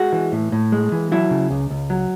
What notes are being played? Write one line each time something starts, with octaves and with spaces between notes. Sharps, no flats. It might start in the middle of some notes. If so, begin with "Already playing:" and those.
Already playing: G#3 F#4
E3
A2
A2
G#3
E3
F#3 E4
C#3
C#2
C#2
F#3